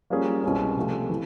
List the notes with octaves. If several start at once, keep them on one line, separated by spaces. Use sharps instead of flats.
G3 A#3 C#4 F4 G#4
C2 B2 G#3 C#4
C3 F3 A3
E3